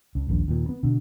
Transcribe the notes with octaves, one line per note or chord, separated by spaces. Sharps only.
C#2
D#1 A#1
D#2 A#2
B3
B2 D3